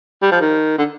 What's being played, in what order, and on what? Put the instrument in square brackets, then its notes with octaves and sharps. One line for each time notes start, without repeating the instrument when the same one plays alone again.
[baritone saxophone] G3
F3
D#3
D3